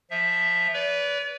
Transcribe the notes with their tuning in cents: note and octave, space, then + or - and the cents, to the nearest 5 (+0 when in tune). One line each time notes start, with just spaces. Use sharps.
F3 +0 E5 +0
B4 +0 D5 -40